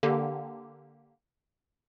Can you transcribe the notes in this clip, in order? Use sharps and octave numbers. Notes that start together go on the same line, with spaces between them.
D3 A#3 G4